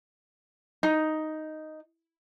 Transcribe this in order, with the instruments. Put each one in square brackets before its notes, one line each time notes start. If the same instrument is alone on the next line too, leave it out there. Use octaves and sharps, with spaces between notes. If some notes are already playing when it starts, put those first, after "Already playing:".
[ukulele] D#4